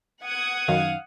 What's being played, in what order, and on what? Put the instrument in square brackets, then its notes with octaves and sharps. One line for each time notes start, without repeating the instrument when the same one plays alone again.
[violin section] F#5 D#6 G#6
[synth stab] F#2 D#3 [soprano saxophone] F5